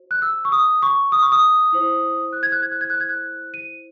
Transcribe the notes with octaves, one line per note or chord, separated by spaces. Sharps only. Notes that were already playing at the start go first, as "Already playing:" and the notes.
Already playing: F#4 C5
F#6
E6
C#6
D#6
C#6
D#6
C#6
D#6
E4 C5
F#6
G#6
F#6
G#6
F#6
G#6
F#6
G#6
F#6
D#7